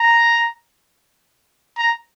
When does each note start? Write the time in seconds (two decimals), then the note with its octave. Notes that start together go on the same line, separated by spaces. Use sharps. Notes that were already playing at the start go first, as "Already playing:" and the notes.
Already playing: A#5
1.77 A#5